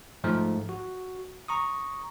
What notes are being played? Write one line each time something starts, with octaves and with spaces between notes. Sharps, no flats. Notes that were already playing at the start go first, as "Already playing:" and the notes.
G#2 F3 A3
F#4
A#5 C#6 D#6